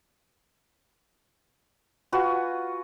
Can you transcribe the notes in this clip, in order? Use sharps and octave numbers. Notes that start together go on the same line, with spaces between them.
F4 F#4 B4 G#5